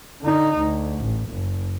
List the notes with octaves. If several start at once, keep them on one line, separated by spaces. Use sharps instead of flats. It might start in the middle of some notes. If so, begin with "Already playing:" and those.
D3 D#4
D2
A1
F#1